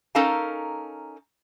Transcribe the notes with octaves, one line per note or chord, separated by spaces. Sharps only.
C#4 D#4 A4 A#4 F5 A5